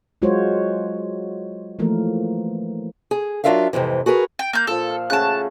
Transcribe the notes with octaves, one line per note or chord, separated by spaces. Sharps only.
F#3 G#3 F4 F#4 C5 C#5
E3 F3 A3 A#3 A#4
G#4
F#3 D4 F4 A#4 E5 F5
F2 G#2 C3 E3
F#4 G#4 A#4 B4
G5
A#3 G6
A#2 F3 A4
F5
C#3 A3 F#4 A5 F#6